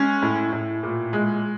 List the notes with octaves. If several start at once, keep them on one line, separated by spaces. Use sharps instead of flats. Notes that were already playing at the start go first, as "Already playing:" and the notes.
Already playing: G#3 C#4
A2
A2
A#2
G#3